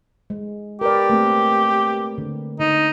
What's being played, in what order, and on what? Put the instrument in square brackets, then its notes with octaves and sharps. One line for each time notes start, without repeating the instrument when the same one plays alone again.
[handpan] G#3
[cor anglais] G4 [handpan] A#4 B4 D5
[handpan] A3 A#3 C4
D3
[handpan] D3 [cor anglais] D#4